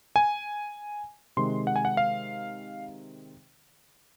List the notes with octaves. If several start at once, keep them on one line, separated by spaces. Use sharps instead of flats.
G#5
C3 D#3 G#3 C6
F#5
G#5
F#5
F5